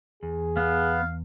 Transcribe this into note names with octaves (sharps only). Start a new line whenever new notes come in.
E2 G#4
B3 F5